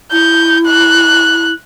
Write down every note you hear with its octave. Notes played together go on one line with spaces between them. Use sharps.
E4 G6
F#6